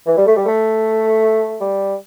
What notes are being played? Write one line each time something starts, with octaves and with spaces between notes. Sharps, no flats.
E3
G3
A3
G3
A3
G3